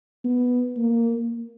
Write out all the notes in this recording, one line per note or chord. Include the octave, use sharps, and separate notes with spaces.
B3
A#3